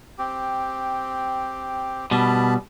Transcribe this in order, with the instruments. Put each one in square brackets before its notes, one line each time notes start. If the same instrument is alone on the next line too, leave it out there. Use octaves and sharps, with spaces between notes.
[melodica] C4 G4
[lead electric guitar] B2 G3 [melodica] A5 B5